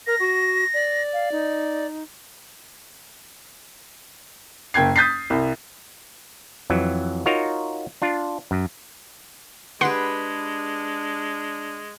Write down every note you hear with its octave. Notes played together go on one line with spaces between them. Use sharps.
A#4 A#6
F#4
D5
F5
D#4
F#1 G5 G#6 C7
D#6 G6 A6 B6 C7
C2
F2 E3 F#3
D#4 F4 F#4 A#4 C#5 F5
D4 F4
F#2
G#3 D4 G4 G#4 B4 F#5 C6